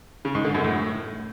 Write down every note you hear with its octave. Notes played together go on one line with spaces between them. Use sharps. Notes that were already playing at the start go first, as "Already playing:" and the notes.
C#3
G#2
D3
F#2
A2